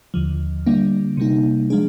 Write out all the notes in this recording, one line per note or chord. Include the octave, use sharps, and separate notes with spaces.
D#2 D3 F3
D3 G3 A#3 D4
C3 G3 A#3 D#4
F3 G#3 D4 G#4